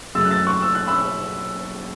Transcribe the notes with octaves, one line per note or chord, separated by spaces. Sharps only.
F#2 C#3 A3 E6 A6
F#6
E6 A6
C#6 F#6
E6
F#6
B5 E6